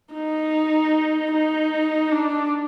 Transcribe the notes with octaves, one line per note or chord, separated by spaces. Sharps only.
D#4
D#4
D4